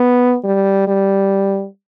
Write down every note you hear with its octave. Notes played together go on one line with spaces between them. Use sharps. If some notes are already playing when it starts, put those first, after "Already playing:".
Already playing: B3
G3
G3